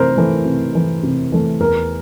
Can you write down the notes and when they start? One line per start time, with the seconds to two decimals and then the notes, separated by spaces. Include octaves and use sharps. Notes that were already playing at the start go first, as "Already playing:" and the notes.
Already playing: C3 E3 A3 A#4 C5
0.17 E3 A3
0.45 C3
0.75 E3 A3
1.03 C3
1.32 E3 A3
1.60 E2 A#4